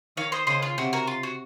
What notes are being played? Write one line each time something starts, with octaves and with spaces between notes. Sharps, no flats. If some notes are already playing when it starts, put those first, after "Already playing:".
D#3 C#5 F5
C5 D#5
C#3 C5 D#5
F4
C3 F#4
F#4 A#4
F4
F#4